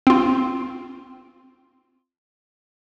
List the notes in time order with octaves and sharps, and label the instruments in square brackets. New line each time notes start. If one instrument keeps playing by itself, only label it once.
[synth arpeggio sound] C4 F4